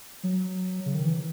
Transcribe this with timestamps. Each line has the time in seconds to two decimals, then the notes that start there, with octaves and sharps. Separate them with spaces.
0.23 F#3
0.86 C#3
0.95 D#3
1.05 E3